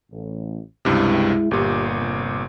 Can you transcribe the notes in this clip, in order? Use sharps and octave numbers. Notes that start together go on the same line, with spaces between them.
A1
C#2 G2 C3 G#3 E4
G1 A#2 G4
C3